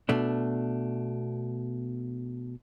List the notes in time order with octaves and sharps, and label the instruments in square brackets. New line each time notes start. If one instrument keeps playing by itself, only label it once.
[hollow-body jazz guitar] B2 A3 D4